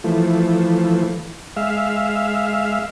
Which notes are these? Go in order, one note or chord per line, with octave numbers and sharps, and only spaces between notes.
E3 F3 A3
G#3 E5 F5